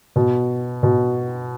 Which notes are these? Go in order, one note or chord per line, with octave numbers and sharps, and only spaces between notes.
B2
B2